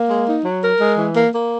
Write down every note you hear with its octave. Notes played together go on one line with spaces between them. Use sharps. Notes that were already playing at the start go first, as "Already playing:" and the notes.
Already playing: A#3
G#3
D#4
F#3
A#4
G#3
E3
A#3
A#3